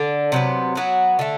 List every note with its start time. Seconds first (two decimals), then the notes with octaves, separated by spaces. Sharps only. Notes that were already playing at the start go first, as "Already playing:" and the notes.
Already playing: D3 D4
0.32 C3 F#3 B3
0.75 F#3 B3 F#4
1.19 D3 A3